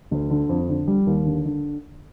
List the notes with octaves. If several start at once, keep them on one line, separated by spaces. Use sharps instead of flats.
D2
D3
F2
D3
G3
D#2
D3
D3